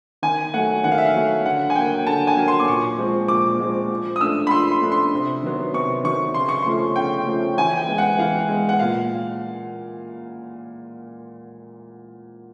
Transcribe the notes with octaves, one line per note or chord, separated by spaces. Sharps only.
D#3 G#5
F#3 A3 F#5
D#3 F#5
F5
E5
F5
F#3 A3
D3 F#5
G#5
F#3 A#3 G5
D3 A5
G#5
F#3 A#3
C6
D6
A#2 C#6
F3 G#3 C4
A#2 D6
F3 G#3 C4
F3
D#6
A3 D4 E6
B5
F3 C6
C6
A3 D4
C6
C3
D#3 F#3 B3
C3 C#6
D#3 F#3 B3 C#6
C#3 C6
C#6
F3 A3 C#4 C6
C#3 G5
F3 A3 C#4
E3 G#5
G5
G#3 B3
F#5
E3 F5
G#3 B3
F#5
A#2 F5